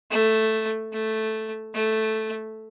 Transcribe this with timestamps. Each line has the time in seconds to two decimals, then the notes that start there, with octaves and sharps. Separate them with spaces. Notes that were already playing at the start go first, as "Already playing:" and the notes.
0.10 A3
0.92 A3
1.74 A3